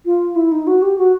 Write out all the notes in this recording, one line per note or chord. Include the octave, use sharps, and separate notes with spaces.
F4
E4
D#4
F#4
G4
F#4